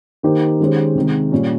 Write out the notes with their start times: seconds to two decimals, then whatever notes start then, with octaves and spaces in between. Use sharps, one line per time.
0.23 D#3 A#3 D#4 G4 C5
0.60 D#3 G#3 C#4 G4 C5
0.95 C3 D#3 G#3
1.32 A#2 G3 C#4